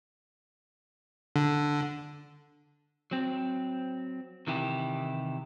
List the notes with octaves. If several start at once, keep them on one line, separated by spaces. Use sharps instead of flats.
D3
F#3 C4
C3 D#3 E3 E4 G4